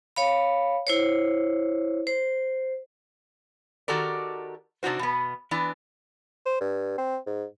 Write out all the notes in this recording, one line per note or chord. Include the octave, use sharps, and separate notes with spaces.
C#5 F5 B5
E4 C5 C#5
C5
D#3 F#4 G4 A4 A#4 D5
C3 D4 D#4 F#4 C5
B2 B3
E3 B3 D4
C5
G2
C4
G#2